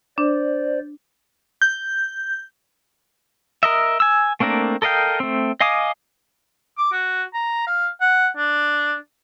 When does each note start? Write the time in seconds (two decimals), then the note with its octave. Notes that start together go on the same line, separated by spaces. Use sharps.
0.18 D4 C5 D5
1.62 G6
3.63 A#4 D#5 E5
4.00 G#5 E6
4.40 A3 A#3 C4 D4 A#4
4.82 A4 A#4 D#5 F5 G5
5.20 A3 C4
5.61 D#5 F5 G#5 D6 D#6
6.78 D6
6.92 F#4
7.33 A#5
7.67 F5
8.01 F#5
8.36 D4